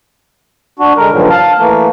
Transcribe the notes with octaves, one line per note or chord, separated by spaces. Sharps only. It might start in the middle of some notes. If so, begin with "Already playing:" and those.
D4 F#4
D3 G#3 A#4
G2 A#2 D3 D#3 F3 F#3
F5 A5
E3 A3 A#3